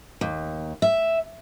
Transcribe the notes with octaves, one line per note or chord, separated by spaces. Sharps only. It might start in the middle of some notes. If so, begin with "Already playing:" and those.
D#2
E5